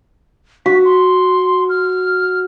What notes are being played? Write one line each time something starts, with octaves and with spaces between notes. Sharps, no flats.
F#4 B6
C6
F6